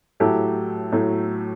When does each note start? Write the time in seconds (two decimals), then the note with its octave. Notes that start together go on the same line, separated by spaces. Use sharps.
0.20 A2 F#3 A3 G4 A4
0.92 A2 F#3 A3